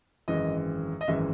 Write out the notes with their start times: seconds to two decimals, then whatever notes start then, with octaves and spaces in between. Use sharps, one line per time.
0.28 G#1 F#2 E3 G#3 D#5
1.01 D#5
1.08 G#1 F#2 E3 G#3 E5